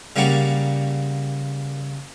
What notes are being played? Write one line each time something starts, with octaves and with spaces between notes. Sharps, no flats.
C#3 G3 A#3 F#4 D5 F#5